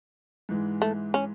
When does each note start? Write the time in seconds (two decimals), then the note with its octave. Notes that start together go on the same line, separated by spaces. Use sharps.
0.49 G#2 E3 G#3
0.82 A3
1.14 C#4